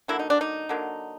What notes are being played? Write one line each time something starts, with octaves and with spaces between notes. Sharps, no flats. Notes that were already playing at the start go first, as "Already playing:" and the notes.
D3 F#3 A#3 E4
D#4
D4
D#4
D3 F#3 A#3